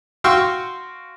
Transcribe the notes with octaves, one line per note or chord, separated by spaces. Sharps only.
F#4 F5 G5 C6 C#6 E6